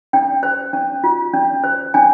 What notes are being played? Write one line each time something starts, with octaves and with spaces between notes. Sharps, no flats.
C#4 G5
C5
C#4
F4
C#4
C5
C#4 G#5